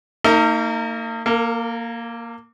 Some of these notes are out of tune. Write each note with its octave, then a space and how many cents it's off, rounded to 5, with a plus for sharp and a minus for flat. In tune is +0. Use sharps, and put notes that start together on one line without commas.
A#3 -35 D#4 +20 A#4 -40
A#3 +0 A#4 -45